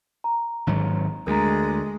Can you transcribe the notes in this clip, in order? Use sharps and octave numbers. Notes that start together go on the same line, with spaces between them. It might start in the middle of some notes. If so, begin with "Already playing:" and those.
A#5
G#1 G#2 F#3
D2 G#3 A#4 A#5